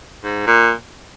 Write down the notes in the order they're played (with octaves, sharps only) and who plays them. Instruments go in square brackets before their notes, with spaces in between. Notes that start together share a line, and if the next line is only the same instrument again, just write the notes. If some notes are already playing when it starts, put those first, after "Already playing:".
[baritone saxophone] G#2
A#2